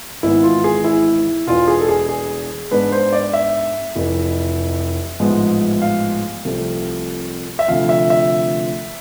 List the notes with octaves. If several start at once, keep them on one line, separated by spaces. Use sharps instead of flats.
G#1 G#2 E3 B3 E4
F4
G#4
E4
E1 E2 B2 F4
G#4
A4
G#4
G#4
G#2 G#3 B3 D4 B4
C5
D5
E5
F1 F2 E3
A1 G#2 F3 G#3 B3
F5
C2 C3 F3 A3
E5
D2 C3 F3 F5
E5
E5